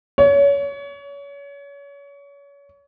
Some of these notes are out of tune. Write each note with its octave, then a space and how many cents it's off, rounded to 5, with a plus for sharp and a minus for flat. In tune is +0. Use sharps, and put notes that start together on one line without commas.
C#5 +30